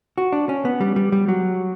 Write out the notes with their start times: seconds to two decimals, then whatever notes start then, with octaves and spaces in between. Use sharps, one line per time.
0.18 F#4
0.32 D4
0.49 C#4
0.65 B3
0.81 G3
0.96 G3
1.12 G3
1.28 F#3